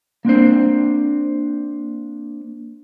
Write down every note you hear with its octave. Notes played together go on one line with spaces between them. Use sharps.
A#3 C4 D4 C5